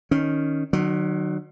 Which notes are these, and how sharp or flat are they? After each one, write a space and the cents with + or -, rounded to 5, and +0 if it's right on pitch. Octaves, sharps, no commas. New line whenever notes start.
D#3 +0 C#4 +0
D#3 -45 F#3 +0